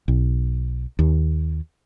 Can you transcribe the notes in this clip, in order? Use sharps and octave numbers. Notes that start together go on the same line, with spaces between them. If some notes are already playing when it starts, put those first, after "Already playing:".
B1
D#2